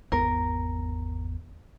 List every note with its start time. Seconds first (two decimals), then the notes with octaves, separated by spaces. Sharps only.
0.12 G#1 E2 B3 A#4